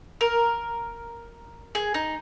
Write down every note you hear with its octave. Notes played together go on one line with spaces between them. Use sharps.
A#4
G#4
D#4